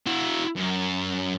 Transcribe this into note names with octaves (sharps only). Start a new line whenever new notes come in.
E4 F#4
F#2